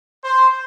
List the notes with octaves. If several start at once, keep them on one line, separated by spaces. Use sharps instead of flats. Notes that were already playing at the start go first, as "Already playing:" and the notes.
C5